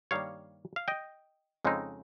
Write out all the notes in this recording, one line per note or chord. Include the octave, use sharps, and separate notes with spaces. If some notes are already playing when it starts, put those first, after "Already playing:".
G2 D#3 G3 A#3 C#5 F5
F5
D#5 G5
F2 C#3 G#3 C4 D#4